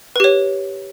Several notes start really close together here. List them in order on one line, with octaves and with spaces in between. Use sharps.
B4 G4 C#5